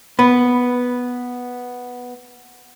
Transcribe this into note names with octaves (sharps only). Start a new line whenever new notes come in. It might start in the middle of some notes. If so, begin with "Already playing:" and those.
B3 B4